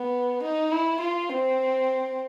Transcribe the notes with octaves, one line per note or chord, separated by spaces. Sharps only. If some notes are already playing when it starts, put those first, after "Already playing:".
Already playing: B3
D#4
E4
F4
C4